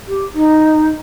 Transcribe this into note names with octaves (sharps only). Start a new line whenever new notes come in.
G4
D#4